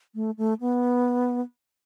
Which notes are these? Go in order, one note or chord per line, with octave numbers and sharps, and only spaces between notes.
A3
A3
B3